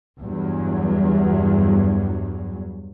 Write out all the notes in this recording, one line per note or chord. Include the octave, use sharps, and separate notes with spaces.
E2 G2 F#3